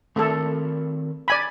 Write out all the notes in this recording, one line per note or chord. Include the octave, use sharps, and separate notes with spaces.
D#3 A3 C4 A4 A#4
D5 G#5 B5